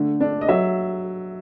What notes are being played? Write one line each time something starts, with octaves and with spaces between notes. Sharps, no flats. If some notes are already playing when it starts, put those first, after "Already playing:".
Already playing: D3 A3
D4
D#5
F#3 E5